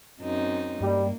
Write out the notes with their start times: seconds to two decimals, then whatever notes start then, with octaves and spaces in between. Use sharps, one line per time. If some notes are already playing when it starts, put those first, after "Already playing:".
0.21 F#2 C4 D#4
0.80 G2 G3 A#3